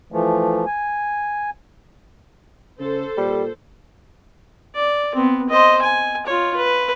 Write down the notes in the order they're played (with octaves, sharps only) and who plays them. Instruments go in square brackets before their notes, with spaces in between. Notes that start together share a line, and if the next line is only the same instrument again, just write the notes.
[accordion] E3 F3 A3
G#5
[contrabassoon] C#3 [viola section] A4 C5
[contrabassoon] A#2 [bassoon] G3
[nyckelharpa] D5
B3 C4
C5 D#5
G#5
F4 C#5
B4